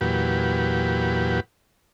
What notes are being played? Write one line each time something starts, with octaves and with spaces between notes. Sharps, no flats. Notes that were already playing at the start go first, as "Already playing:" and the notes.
E2 A#2 F#3 G4 B4